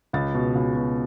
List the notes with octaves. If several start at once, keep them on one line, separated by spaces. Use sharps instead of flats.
C#2 A6
B2
C#2
B2